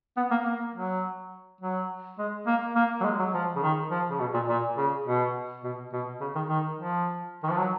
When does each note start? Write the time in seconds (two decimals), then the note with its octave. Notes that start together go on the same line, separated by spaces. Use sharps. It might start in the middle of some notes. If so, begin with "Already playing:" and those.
0.17 B3
0.31 A#3
0.45 A#3
0.74 F#3
1.61 F#3
2.18 G#3
2.47 A#3
2.75 A#3
3.01 F#3
3.05 G#3
3.19 F#3
3.34 F3
3.56 C#3
3.63 D#3
3.91 F3
4.10 C#3
4.20 B2
4.34 A#2
4.49 A#2
4.77 C#3
5.06 B2
5.64 B2
5.93 B2
6.21 C#3
6.35 D#3
6.50 D#3
6.79 F3
7.43 D#3
7.50 F3
7.58 F#3